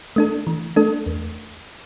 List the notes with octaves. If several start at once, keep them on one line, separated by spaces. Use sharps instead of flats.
A3 D4 A4
E3
A3 D4 A4
E2